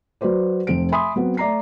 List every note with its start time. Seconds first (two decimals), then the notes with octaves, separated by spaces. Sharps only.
0.21 F#3 F#4 B4 C5 D5
0.67 F1 C4 D7
0.92 E5 G#5 B5 C6 D#6
1.16 F#3 B3 C4
1.37 A3 D5 A#5 C7